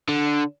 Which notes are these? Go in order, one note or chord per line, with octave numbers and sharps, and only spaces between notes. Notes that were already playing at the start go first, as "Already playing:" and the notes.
D3